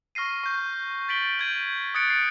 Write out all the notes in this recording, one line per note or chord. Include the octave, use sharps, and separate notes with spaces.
C#6 F6 A#6 C7 D#7
C#6 G6
A6 B6 D7 F#7 G7
G6 G#6 D#7
D#6 F#6 G#6 A6 C#7 D7
G#6 C7